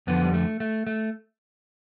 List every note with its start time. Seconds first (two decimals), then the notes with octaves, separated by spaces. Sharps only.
0.07 F2 D3 F3 B3
0.23 G3
0.34 A3
0.60 A3
0.87 A3